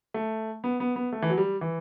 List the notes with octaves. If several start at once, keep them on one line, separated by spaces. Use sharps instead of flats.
A3
B3
B3
B3
A3
E3
F#3
G3
E3